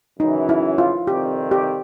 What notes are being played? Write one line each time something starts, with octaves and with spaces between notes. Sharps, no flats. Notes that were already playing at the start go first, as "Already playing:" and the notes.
F#2 C#3 E3 D#4
E4
F4
F2 C3 D#3 G3 C4 G4
G4